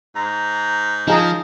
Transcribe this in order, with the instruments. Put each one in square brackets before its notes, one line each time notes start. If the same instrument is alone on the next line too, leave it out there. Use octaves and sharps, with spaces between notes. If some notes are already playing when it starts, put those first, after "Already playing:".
[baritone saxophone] G#2 [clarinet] A#5
[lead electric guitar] F3 [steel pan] D#4 G#4 A#5